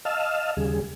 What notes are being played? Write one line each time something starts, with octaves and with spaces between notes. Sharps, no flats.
D#5 F5 A5 E6 F6
D#2 C#3 G3 G#4